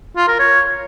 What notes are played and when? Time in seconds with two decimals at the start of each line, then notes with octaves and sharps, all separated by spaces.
0.16 F4
0.28 A#4
0.39 C#5